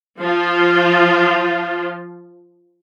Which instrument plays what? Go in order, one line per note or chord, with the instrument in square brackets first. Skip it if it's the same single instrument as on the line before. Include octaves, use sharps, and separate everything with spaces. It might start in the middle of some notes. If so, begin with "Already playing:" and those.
[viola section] F3 F4